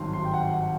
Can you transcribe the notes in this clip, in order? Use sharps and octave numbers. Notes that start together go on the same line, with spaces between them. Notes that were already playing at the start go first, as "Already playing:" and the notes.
Already playing: G#1 G2 D#3 F#3 C6
C6
G5
F#5
F#5